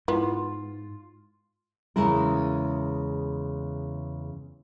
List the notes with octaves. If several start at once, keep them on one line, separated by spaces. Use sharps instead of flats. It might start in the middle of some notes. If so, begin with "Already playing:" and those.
G#2 B3 E4 F4
E2 C#3 G#3 E4 A#4